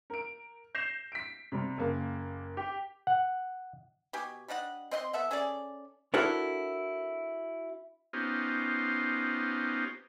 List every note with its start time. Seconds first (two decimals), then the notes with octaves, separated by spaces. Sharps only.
0.10 A#4 D7
0.75 G6 A#6 C7 E7 F7
1.12 B6 D7
1.52 C3 G3
1.78 F#1 A#3
2.57 G4
3.07 F#5
4.13 B2 G4 G#5
4.48 G3 D4 D#5 F#5
4.91 C4 D#5 F#5 C6
5.13 B3 A4 E5 F#5
5.31 C#4 G#4 A4 D5
6.14 D4 E4 F#4 A4 A#4 C#5
8.13 B3 C#4 D#4 F4 G4 C5